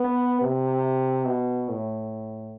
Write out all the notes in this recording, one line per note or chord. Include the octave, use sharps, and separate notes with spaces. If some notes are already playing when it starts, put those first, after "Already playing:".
Already playing: B3
C3
B2
A2